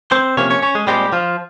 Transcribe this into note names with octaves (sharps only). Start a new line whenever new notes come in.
C4 C5
C3 F3 A#3 C#4 C#5
C#4 C#5
C#4 C#5
G#3 G#4
A#2 G3 G#3 C4 G4
F3 F4